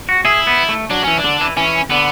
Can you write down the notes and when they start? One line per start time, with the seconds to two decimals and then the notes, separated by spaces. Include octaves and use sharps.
0.09 F#4
0.25 E4 G#4
0.47 B3
0.69 A3
0.91 F#3 D4
1.04 E3 C#4
1.19 D4
1.24 D3
1.41 E3
1.57 E3 C#4
1.90 D3 B3